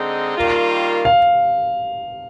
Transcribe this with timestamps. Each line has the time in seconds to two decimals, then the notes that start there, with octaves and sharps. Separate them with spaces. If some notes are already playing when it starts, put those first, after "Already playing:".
Already playing: D3 G#3 C4 D#4
0.36 D#3 G3 A#3 F4
1.05 F5